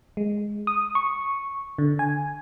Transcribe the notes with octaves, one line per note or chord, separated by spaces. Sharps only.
G#3
D#6
C#6
D3
G#5